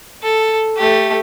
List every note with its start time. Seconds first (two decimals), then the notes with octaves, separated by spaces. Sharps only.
0.23 A4
0.77 A3 G4